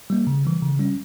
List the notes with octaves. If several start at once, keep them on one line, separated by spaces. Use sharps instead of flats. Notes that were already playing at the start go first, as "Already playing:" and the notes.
G3 A#3
C#3
E3 G3
C#3
G3 C#4